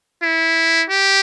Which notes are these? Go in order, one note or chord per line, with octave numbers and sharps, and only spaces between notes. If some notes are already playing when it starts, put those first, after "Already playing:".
E4
G4